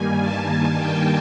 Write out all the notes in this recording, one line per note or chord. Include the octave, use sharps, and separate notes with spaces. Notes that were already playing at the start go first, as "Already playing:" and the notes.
Already playing: G2 D#3 G3 A#3 G#5
A5
A5
G5